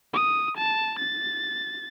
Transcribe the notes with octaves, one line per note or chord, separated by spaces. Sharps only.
D#6
A5
A6